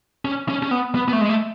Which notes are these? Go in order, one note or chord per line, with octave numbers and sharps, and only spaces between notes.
C#4
C#4
C#4
B3
B3
B3
A3
G#3
A3